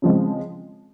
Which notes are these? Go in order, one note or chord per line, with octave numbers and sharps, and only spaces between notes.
C#3 F3 G#3 C4